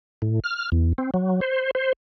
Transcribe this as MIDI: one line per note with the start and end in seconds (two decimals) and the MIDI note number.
0.22 0.40 45
0.44 0.70 89
0.72 0.93 40
0.98 1.10 60
1.14 1.40 54
1.41 1.71 72
1.75 1.93 72